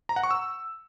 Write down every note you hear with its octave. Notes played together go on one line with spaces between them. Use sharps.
A#5
F#5
C#6
E6